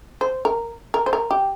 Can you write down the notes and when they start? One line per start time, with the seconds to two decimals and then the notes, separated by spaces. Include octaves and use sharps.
0.21 C5
0.45 A#4
0.94 A#4
1.06 C5
1.13 A#4
1.31 G4